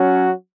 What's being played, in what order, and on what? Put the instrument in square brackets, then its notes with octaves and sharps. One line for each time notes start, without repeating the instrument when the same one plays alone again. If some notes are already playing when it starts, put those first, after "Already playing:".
Already playing: [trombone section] F#3 C#4 F#4